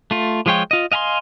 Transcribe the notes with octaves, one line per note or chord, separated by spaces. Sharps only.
A3 F4
F3 G#3 F4 C#5 G5
F4 D#5
D#5 F5 G#5 A#5 C6